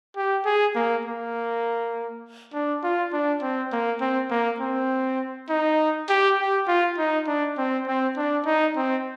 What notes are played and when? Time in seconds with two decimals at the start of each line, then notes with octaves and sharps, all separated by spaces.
0.16 G4
0.45 G#4
0.75 A#3
1.06 A#3
2.53 D4
2.84 F4
3.13 D4
3.42 C4
3.72 A#3
4.01 C4
4.31 A#3
4.60 C4
5.49 D#4
6.09 G4
6.39 G4
6.68 F4
6.98 D#4
7.27 D4
7.58 C4
7.87 C4
8.17 D4
8.46 D#4
8.76 C4